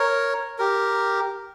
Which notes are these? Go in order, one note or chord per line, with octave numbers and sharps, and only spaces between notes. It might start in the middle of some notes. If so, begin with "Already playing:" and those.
Already playing: A#4 C#5
G4 A#4